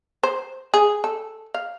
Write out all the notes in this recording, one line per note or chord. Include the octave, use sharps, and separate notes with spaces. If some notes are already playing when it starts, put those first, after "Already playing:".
C5
G#4
A4
F5